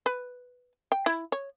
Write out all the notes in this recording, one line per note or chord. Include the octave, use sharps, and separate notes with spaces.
B4
G5
E4
C#5